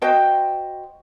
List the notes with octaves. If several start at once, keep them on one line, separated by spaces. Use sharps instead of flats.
F#4 C5 D#5 G5